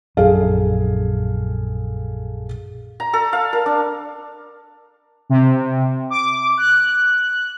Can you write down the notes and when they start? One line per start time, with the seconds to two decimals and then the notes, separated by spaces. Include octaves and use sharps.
0.17 A#1 F#2 G#4 A4 F5
3.00 A#5
3.13 A4
3.33 F5
3.53 A#4
3.66 D4
5.30 C3
6.10 D6
6.57 F#6